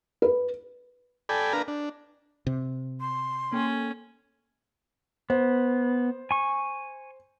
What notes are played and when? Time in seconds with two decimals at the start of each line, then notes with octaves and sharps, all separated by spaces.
0.22 B4
1.29 A4 D5 G5 G#5 B5
1.53 D4 A#4 B4 F5 A#5
1.68 D4
2.47 C3
3.00 C6
3.53 A#3 C#4 A4 G5
5.30 B3 C5
6.31 G#5 C#6